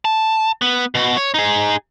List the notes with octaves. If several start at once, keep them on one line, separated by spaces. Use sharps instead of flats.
A5
B3
B2 F#4
C#5
D#4 G#4